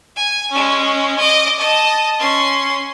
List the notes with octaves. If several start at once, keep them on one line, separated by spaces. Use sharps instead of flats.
G#5
G#3 C#4
D#5 D6
D#5 A5
C#4 C6